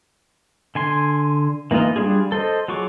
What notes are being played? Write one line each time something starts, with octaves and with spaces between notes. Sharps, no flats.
D3 G#5 C6
E3 A#3 D#4 F4 D#5
G3 B3 D4 F4 G#4
A4 C5 D#5
F#3 F4 G#4 C#6 D6